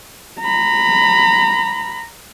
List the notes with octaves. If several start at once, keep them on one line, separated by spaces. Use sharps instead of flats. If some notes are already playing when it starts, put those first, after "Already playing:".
A#5 B5